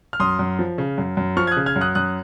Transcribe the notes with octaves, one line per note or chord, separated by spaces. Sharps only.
F6
F#2 C6 D#6
F#2
F3
C#3
F#2
F#2
F3 C#6 F6
G#6
D#6 F#6
C#3
F6 G#6
F#2
D#6 F#6
F#2 D#6 F#6